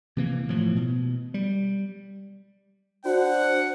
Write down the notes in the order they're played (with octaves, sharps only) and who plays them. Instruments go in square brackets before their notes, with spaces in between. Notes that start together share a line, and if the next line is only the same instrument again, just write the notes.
[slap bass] C3 E3 A#3
A2 E3 F3
B2
G3
[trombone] D4 [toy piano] F#4 [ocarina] C5 [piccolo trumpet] F#5